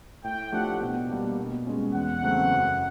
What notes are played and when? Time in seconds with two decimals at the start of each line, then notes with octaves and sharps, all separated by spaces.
0.24 A2 G5
0.52 F3 A3 D4 G4 F#5
0.81 B2
1.09 G3 A#3 D4
1.38 B2
1.67 G#3 C#4
1.94 E2 F#5
2.23 C#3 F#3 A3 C4
2.51 F#2